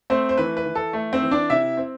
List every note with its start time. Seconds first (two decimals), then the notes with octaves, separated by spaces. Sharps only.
0.10 A3 C4 C5
0.29 C5
0.37 E3 B4
0.57 B4
0.66 E3
0.75 A4
0.93 A3
1.13 C4 C5
1.22 E3
1.31 D4 D5
1.50 C3 E4 E5
1.77 C4